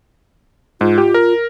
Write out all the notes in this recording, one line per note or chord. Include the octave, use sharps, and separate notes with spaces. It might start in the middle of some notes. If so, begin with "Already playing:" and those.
G#2 F4
G4
A#4